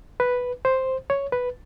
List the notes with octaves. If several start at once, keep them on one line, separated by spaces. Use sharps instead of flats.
B4
C5
C#5
B4